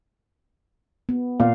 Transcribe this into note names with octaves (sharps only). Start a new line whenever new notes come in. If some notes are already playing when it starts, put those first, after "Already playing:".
B3
A#2 F5